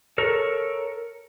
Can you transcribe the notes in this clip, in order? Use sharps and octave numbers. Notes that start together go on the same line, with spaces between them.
A4 A#4 C#5